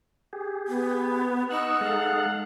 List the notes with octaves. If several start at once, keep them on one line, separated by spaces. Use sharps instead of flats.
G4 G#4
B3
D#4 F#5 C#6 E6
G#3 A4 F5